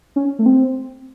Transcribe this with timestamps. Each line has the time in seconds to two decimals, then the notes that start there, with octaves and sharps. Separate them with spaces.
0.16 C#4
0.39 A3
0.46 C4